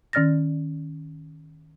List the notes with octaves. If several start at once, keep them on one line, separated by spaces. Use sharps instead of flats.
D#3 C#4 D5 F6 A6 A#6